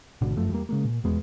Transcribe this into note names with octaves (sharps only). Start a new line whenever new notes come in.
G#1 B2 D3 D4
G1 F#2 F3 A3
E2 G3 A#3
C#3 G#3 A#3
A#2
D#1 E2 G#3 B3